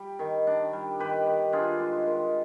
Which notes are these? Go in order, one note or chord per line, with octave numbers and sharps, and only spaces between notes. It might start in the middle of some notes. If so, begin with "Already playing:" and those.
Already playing: G3
D#3
D4
G3
D#3 G4 B4
D#3
D4 F4 G#4
G#3
D#3